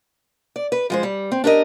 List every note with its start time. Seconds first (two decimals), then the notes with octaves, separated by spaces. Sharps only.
0.56 D5
0.72 B4
0.90 F3 G#3 C5
1.03 G3
1.32 C4
1.44 D4 G4 A#4 D#5